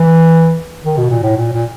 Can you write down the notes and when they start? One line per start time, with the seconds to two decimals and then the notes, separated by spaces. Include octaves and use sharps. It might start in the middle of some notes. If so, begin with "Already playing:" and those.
Already playing: E3
0.85 D#3
0.97 B2
1.10 A#2
1.23 A2
1.37 A#2
1.53 A#2